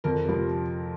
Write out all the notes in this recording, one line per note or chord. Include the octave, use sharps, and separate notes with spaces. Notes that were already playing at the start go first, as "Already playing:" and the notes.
F2 A#4
C3 F3